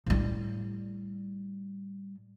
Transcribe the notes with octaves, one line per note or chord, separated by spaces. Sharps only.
A2 G3